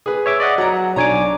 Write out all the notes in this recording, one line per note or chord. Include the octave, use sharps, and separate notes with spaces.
G#4 B4
C#5 E5 D6
D5 D#5 F#5
F#3 F#5 A#5
B1 D4 C#5 G#5 A#5 D6